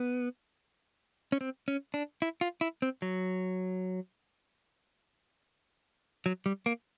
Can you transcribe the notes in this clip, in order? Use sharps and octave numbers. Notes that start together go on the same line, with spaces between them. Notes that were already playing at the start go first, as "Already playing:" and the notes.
Already playing: B3
C#4
C4
C#4
D4
E4
F4
E4
C4
F#3
F#3
G3
A#3